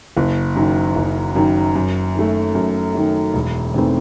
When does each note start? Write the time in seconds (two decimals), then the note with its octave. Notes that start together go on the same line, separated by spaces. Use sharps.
0.17 F#1
0.56 F#2 D#3
0.96 F#1
1.35 F#2 D#3
1.75 F#2
2.15 D#3 A3
2.55 F#2
2.95 D#3 A3
3.34 E1
3.74 E2 D#3 A3 C4